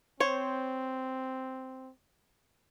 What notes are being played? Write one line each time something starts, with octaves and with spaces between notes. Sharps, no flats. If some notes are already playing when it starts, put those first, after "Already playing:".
C4 C5 C#5